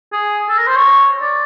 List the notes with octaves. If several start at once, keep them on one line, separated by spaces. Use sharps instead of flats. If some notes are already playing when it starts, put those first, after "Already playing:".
G#4
A4
A#4
C5
C#5
D5